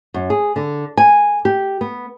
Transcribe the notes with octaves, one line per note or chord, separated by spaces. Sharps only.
F#2
G#4
D3
G#5
G4
B3